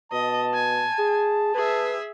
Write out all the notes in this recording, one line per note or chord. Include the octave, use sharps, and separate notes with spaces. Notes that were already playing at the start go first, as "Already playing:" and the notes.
B2 D#5 A5
G#5
G#4
G#4 B4 E5